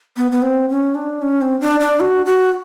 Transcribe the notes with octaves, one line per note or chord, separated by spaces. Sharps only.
B3
B3
C4
C#4
D4
C#4
C4
D4
D4
F#4
F#4